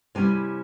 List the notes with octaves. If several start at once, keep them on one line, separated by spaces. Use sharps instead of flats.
C3 G3 C#4 E4 G#5